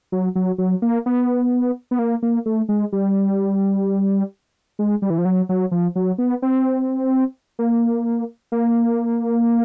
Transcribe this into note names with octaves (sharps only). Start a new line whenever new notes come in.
F#3
F#3
F#3
A#3
B3
B3
A#3
A#3
A3
G#3
G3
G#3
G3
E3
F3
F#3
F#3
F3
F#3
B3
C4
A#3
A#3